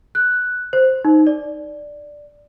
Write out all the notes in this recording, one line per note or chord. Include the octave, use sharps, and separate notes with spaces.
F#6
C5
D#4
D5